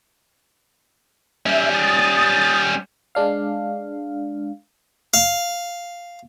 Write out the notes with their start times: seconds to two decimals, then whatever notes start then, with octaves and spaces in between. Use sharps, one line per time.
1.46 G3 C#4 E5
1.74 D#6 A6
3.15 G#3 D4 F5
5.14 F5